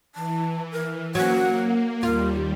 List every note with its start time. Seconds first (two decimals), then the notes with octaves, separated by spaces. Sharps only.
0.15 E3 A5
0.72 A#4
1.15 F#3 A#3 C#4 F#5
2.03 D#2 G3 F4 A#4